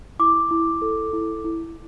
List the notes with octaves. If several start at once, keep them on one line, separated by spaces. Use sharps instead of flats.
E4 D6
E4
A4
E4
E4